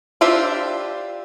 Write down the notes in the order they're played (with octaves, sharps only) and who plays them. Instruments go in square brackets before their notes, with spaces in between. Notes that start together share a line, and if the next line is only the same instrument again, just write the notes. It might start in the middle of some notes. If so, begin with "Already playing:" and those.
[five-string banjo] D4 F4 G4 C5 E5